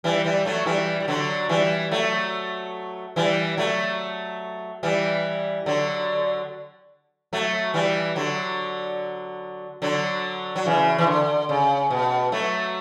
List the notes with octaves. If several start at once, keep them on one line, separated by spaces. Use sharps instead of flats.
E3 G3
E3 G3
F#3 A3
E3 G3
G3
D3 F#3
E3 G3
F#3 A3
E3 G3
F#3 A3
E3 G3
D3 F#3
F#3 A3
E3 G3
D3 F#3
D3 F#3
F#3
C#3 E3
E3
D3
C#3
B2
F#3 A3